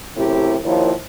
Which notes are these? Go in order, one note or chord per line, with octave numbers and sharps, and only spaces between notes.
F#2 A2 C3 E4 G4
D#2 F3 E4 A#4 C#5